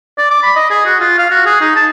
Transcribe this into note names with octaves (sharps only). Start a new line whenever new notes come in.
D5
D6
B5
D#5
G#4
F#4
F4
F5
F#4
G#4
D#4
A5